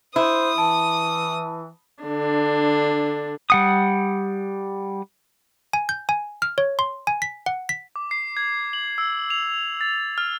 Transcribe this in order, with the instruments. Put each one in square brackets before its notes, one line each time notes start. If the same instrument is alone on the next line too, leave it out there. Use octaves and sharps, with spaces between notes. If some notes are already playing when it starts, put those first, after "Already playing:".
[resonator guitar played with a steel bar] E4 [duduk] C5 [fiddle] D#6
[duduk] E3 [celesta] A5
[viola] D3 D4
[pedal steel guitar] G3 F#5 D#6
[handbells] G#5
G6
G#5
F6
C#5
C6
G#5
B6
F#5
B6
[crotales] D6
C7
G#6
F#7
E6
F7
A6
F6